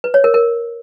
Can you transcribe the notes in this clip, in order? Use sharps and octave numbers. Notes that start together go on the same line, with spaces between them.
B4
C#5
A#4
A#4